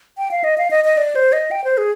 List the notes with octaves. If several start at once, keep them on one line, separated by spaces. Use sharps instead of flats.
G5
F5
D#5
F5
D#5
D#5
D5
C5
D#5
G5
C5
G#4